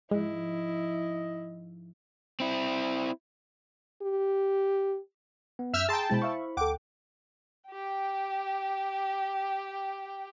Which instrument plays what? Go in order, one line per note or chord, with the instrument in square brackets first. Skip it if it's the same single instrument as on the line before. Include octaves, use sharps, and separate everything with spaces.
[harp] G#2 F3 [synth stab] G#3 [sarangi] E4 [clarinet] D#5
[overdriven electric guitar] C4 E4
[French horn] G4
[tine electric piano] B3
[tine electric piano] F#2 G6 [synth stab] E5 E6 F6
[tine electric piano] G#4 [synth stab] G5 A5 [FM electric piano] A#5 C6 E6
[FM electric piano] B2 G#3 A6 [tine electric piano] E4 C5 B5
[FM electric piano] E5 F5 C#6
[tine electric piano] D2 G5 [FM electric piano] A4 F#5 [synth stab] D6
[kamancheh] G4 G5